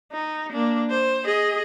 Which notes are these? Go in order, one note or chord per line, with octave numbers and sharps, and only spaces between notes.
D#4
A#3 D4
C5
G#4 D#5